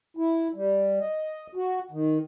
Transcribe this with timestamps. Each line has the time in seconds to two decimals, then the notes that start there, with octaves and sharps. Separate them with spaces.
0.17 E4
0.55 G3
1.00 D#5
1.55 F#4
1.91 D#3